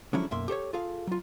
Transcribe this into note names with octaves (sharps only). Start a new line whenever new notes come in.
D3 F3 F#3 G#3 C#4 E4
B1 F#2 A#3 E5 C6
G4 A4 C5 C#5
F4 G#4 A4 F5
F#3 F4